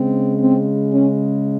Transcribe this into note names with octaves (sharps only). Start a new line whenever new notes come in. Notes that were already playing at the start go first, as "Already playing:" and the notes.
Already playing: C#3 G#3 C4
C4
C#4